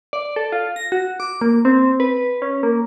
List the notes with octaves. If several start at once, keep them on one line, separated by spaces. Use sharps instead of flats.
D5
A4
F4
A#6
F#4
D6
A#3
C4
B4
C#4
A#3